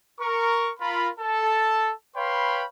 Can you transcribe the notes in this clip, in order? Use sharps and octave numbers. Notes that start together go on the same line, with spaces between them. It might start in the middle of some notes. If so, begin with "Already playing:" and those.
A#4 C#6
F4 A#4 B5
A4 A5
B4 C#5 F5 G5 B5 C6